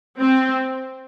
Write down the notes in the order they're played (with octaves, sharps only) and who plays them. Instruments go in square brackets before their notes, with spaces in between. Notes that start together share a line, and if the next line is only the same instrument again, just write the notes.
[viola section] C4